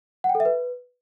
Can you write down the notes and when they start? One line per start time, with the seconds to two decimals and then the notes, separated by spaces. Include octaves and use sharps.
0.24 F#5
0.29 G5
0.35 A4
0.40 E5
0.45 B4